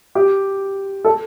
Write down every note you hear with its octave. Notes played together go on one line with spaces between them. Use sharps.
G4
A4